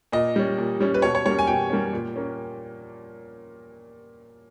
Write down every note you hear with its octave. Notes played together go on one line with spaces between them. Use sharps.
A#2 D#5
G3 C#4
A#2
G3 C#4
B4
B2 C#5
C#5
G3 A#3 C#4 C#5
G#5
B2 G5
G3 A#3 C#4
A#2
A#3 C#4